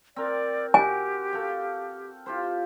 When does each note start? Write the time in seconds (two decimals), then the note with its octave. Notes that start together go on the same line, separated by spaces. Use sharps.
0.16 C4 A#4 D5 G5
0.74 F#4 G4 G#5
1.33 A4 F5 G5
2.26 F4 G4 C5